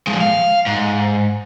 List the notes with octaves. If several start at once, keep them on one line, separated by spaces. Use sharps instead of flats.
F3 G#3
F5
G#2